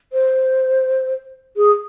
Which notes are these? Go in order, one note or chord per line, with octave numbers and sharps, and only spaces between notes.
C5
G#4